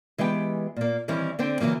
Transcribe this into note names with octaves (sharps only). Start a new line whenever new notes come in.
E3 G#3 B3 G4 G5
A#2 A#3
D#3 E3 G3 C4 C#4 E4
D3 C4 C5 G5
C#3 E3 F#3 A#3